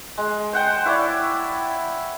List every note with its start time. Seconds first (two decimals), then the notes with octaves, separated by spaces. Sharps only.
0.18 G#3
0.53 C5 F#5 G5
0.85 E4 C#5 D5